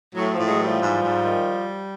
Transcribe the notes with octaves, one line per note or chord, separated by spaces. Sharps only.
A2 F#3
F3
A2
F#3 G#3
E3
F3 G3
G#2
G#2
D#3